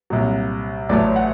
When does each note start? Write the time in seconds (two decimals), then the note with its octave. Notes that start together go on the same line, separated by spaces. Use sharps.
0.10 C2 A#2 F#3
0.89 A1 A2 F#3 A3 D5
1.16 F#5